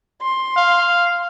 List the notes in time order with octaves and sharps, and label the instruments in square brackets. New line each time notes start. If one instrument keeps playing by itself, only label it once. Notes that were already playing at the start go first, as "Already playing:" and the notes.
[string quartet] C6
[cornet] F5